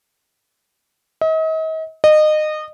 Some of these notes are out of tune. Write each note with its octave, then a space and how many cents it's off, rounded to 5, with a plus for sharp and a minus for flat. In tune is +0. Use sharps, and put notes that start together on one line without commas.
D#5 +40
D#5 -25